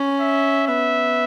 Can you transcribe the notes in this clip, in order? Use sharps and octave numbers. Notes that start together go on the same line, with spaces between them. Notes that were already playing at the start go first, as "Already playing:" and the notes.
Already playing: C#4
E5
B3 E5